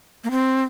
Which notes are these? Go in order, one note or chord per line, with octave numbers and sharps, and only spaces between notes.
A#3
C4